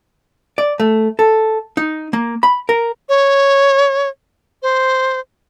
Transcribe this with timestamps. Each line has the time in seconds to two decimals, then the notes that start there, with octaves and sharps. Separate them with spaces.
0.58 D5
0.80 A3
1.19 A4
1.77 D#4
2.13 A#3
2.43 B5
2.69 A#4
3.09 C#5
4.62 C5